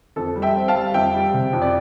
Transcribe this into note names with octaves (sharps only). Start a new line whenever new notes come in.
F2 A4
G3
E5 G5
C4
F5 A5
G3
F2 E5 G5
G3
C3
F2
D5